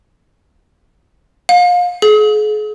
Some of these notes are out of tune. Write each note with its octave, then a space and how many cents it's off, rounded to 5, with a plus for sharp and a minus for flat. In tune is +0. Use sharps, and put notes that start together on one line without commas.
F5 +30
G#4 +40